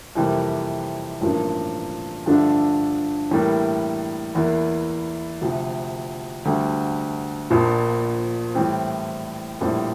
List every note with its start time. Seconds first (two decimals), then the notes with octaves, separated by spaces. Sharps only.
0.15 F2 C3 E3 G3 A#3
1.21 A1 G2 F3 A#3 D4
2.26 G2 D3 F3 A3 D4
3.31 A2 E3 G3 A#3
4.35 E2 E3 A#3
5.41 D2 C3 F3
6.45 D2 D3 G3
7.50 A#1 A#2 F3
8.55 A2 E3 G3 C4
9.61 A#1 A2 G3 C4 E4